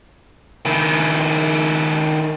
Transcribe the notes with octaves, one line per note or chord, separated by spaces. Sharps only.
D#3 E4